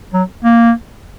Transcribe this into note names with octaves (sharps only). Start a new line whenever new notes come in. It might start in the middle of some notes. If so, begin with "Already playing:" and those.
F#3
A#3